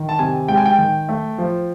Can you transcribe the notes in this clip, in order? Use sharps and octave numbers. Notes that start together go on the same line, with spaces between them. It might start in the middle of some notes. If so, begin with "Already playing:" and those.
Already playing: D#3
A5
C3 G#5
G#3 G5
G#5
G5
D#3
A3
F3